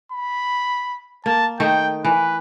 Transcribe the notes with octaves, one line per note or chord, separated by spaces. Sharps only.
B5
A#3 A5
D#3 A3 D#4 G5
E3 B4